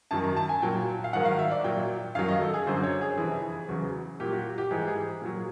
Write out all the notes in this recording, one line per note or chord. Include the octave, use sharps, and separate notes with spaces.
F#2 D#3 F#3 A5
A#5
A5
G#5
A#2 F#3 G5
F5
G#2 D#3 F#3 F#5
F5
E5
D5
A#2 F#3 G5
F#2 D#3 F#3 F5
D#5
A4
G#4
F#2 D3 F#3 C5
C#5
G#4
F2 C3 E3 G#4
E2 C#3 F#3
A#2 F#3 G4
F#4
G4
G#2 E3 G#4
G#4
A#2 F#3